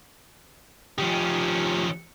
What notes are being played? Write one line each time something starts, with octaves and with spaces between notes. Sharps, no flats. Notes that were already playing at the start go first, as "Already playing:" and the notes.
D#3 F3 C#4 G4